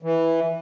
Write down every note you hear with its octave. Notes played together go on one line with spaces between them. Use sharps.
E3